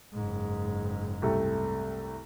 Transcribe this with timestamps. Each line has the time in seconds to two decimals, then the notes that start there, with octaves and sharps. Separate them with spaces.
0.13 F#1 G#2
1.22 C2 A3 G4